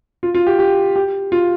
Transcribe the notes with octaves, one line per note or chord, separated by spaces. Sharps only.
F4
F4
G4
G4
G4
F4